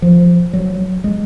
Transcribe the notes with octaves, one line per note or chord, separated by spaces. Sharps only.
F3
F#3
G#3